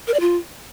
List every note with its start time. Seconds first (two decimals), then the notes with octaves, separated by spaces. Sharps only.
0.07 A#4
0.14 D5
0.20 F4